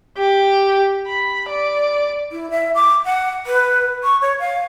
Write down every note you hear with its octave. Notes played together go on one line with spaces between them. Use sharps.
G4
B5
D5
E4
E5
D6
F#5
B4
C#6
C#5
F5